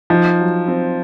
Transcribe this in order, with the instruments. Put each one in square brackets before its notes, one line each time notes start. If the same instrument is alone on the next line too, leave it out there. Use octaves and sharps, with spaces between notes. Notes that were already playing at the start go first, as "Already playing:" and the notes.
[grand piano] F3 [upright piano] D#4
[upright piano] F#3
C4